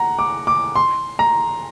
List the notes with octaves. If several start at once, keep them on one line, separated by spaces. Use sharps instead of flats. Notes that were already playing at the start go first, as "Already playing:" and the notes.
Already playing: F#5 A#5
D6
D6
C6
A#5